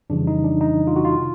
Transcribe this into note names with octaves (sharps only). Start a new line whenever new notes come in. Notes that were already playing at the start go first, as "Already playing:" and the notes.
F2 C#3 E3 G3 D4
D#4
D4
D#4
F4
F#4
F4
C3 D#3